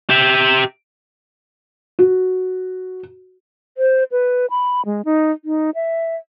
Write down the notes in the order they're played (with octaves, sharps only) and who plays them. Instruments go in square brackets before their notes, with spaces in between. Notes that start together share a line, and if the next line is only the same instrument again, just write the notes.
[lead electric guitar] G4 E5
[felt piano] F#4
[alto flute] C5
B4
B5
G#3
D#4
D#4
E5